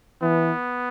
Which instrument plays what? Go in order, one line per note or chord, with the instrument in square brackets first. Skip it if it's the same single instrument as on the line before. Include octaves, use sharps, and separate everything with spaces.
[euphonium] E3 [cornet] B3